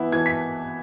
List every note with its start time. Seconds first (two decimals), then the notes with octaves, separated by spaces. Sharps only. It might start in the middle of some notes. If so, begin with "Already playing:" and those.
Already playing: E3 B3 E4
0.12 E3 G#6
0.26 B6